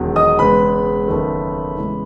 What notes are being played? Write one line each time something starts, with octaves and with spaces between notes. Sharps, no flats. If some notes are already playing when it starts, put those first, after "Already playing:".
Already playing: E1 E2 D#3 F#3
D#5 D#6
E1 E2 C#3 G#3 B4 B5
F#1 E2 D#3 A3
E2 C#3 E3 G#3